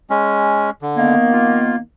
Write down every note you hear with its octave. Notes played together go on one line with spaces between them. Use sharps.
G#3 C#4
D3
D#3 A#3 B3
F4